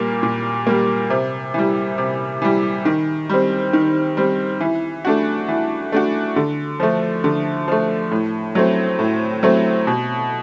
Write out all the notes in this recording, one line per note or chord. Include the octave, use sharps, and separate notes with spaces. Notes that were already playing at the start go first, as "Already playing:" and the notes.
Already playing: A#2 G3 A#3
A#2
G3 A#3
C3
E3 G3
C3
E3 G3
D#3
G3 C4
D#3
G3 C4
E3
A3 D4 F#4
E3
A3 D4 F#4
D3
F3 A3
D3
F3 A3
A2
F#3 A3 C4
A2
F#3 A3 C4
B2